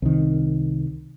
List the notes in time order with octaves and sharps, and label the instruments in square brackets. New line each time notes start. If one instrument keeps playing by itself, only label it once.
[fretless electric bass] C2 D#3